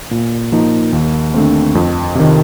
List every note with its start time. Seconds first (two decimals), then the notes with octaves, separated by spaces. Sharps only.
0.11 A#2
0.52 F3 A#3 D#4
0.93 D#2
1.34 D3 A3 C4
1.75 F2
2.15 C3 D#3